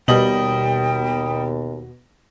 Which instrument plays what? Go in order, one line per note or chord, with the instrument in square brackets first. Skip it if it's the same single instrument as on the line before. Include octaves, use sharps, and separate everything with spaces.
[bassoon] D#2 [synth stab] B2 [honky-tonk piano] G3 D#5 F#7 [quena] G5